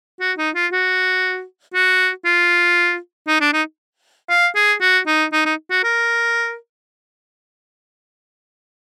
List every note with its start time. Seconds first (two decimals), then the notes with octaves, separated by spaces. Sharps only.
0.20 F#4
0.38 D#4
0.55 F4
0.72 F#4
1.74 F#4
2.25 F4
3.27 D#4
3.41 D4
3.53 D#4
4.30 F5
4.56 G#4
4.81 F#4
5.07 D#4
5.33 D#4
5.45 D#4
5.70 F#4
5.84 A#4